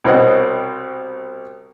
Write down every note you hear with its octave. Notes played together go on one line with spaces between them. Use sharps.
C2 B2 C4 C#5 D#5 F#5